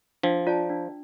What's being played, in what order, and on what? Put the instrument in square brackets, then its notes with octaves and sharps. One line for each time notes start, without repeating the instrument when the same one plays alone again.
[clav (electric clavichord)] F3 [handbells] D4
[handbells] F4 D5 A5
D4